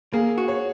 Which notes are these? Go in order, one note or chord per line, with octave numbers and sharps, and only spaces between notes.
A#3 G#4
F#4
C#5